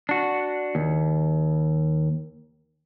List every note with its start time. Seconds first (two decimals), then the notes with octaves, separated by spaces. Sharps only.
0.09 D4 F#4
0.75 D#2